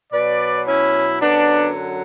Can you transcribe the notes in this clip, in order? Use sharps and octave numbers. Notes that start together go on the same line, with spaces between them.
B2 F#3 B4 D5
C#4 E4
F#2 D3 F#3 B3 D4